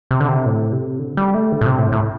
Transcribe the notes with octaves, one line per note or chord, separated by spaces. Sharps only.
C3
D3
C3
A2
C3
D3
G3
A3
D3
A2
C3
A2
A2